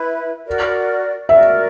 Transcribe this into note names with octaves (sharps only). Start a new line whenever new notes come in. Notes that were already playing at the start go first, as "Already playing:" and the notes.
Already playing: E4 B4 E5
F#4 A#4 D5
F#4 A#4 D5 E5